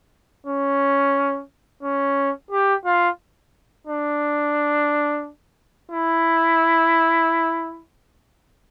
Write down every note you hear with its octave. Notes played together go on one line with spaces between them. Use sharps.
C#4
C#4
G4
F4
D4
E4